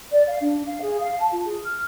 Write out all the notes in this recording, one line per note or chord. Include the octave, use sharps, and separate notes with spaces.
D5
F5
D4
F5
G#4
F5
A5
F4
G#4
F6